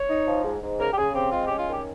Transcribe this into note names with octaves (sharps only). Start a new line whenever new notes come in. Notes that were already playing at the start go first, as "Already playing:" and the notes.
Already playing: C#5
D#4
F3
G#2
G#2
C#3 A#4
G4
C#3 G#4
C4 G4
G#3 F4
G4
C#4
F4
D#3 G4